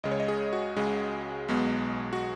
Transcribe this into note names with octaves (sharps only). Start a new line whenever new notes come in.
C#2 C#3 G#3 D#5
C#5
D#5
G#4
F#4
C#2 C#3 G#3 G#4
B1 B2 G#3 B3
F#4